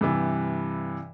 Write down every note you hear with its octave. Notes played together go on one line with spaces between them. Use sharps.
G2 C3 E3